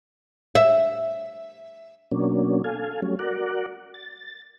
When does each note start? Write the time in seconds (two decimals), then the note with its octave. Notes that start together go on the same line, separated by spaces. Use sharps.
0.55 E5
2.11 B2 F#3 A#3 C#4 D4
2.64 A4 F5 G#5
3.02 F#3 G3 A3 C#4
3.19 F#4 A#4 D5 F#5
3.94 A6